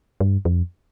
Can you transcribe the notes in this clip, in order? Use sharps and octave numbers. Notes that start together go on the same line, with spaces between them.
G2
F2